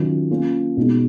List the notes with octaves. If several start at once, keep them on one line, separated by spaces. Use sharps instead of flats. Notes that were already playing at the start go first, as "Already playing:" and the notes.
Already playing: D#3 F#3 C#4 F4
A#3 C#4 F4
B2 G#3 D#4